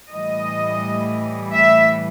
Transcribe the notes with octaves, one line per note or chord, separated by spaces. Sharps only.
A2 E3 G3 D#5
E5